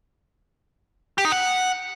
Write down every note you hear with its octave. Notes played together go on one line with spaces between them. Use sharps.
G4
D#4
F#5